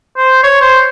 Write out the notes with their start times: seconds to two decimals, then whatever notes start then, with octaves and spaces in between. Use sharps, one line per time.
0.17 C5
0.43 C#5
0.61 C5